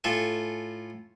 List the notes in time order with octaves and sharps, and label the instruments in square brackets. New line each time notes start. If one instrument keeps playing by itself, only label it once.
[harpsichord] A2 F4 A4 G#5